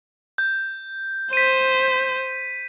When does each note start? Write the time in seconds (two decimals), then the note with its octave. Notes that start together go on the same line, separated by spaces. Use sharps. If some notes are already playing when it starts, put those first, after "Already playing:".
0.38 G6
1.33 C5 B6 D#7